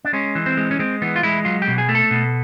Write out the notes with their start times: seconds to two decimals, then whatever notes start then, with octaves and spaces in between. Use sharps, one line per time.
0.05 D4
0.13 G#3 C#4
0.35 E3
0.46 C4
0.57 G#3
0.71 C#4
0.79 G#3 C4
1.02 E3 B3
1.16 F4
1.23 G#3 E4
1.45 F#3 F4
1.62 G4
1.68 B2
1.78 G#4
1.89 A3
1.95 A4
2.11 B2